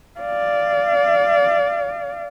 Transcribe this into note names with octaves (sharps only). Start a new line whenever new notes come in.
D5 F5